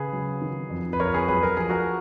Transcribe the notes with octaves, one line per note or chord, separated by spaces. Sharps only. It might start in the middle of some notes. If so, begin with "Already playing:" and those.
Already playing: C#3 G#4 B4
F#3
D#3
F2
B4
F2 A#4 C#5
G#4 B4
F#3 G#4 B4
A#4
F3 G#4
F#4 A#4